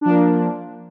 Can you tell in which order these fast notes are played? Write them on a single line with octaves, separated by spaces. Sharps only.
D4 F3 A#3